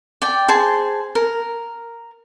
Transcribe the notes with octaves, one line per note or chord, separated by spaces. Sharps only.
D5 G5
G#4 C5 A5
A#4